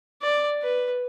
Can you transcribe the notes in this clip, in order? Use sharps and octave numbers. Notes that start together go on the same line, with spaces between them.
D5
B4